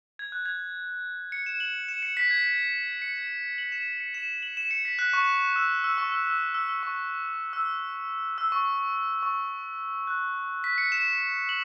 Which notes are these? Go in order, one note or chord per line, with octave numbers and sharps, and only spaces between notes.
G#6
F#6
G#6
C#7
E7
F#7
E7
C#7
B6
G#6
C#7
E7
F#7
E7
E7
C#7
E7
F#7
E7
C#7
B6
F#6
C#6
E6
E6
C#6
E6
E6
E6
E6
C#6
E6
E6
C#6
C#6
F#6
B6
C#7
E7
F#7